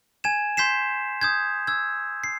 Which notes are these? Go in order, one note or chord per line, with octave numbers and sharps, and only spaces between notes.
G#5 G#6 E7
C6 G6 B6 C7 E7
D#6 G6 G#6
E6 G#6
C7